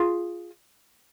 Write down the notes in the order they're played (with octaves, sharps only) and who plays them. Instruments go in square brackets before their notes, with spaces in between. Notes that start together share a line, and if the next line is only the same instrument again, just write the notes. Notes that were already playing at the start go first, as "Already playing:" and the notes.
Already playing: [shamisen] F4 G#4